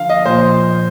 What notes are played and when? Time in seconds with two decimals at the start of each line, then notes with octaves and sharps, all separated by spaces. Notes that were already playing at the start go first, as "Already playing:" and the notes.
Already playing: D3 F3 F5
0.09 D#5
0.25 A#2 F3 C5